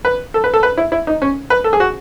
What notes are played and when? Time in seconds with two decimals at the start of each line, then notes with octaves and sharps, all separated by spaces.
0.05 B4
0.34 A4
0.44 B4
0.54 A4
0.63 B4
0.77 E4
0.92 E4
1.07 D#4
1.22 C#4
1.50 B4
1.64 A4
1.73 G#4
1.80 F#4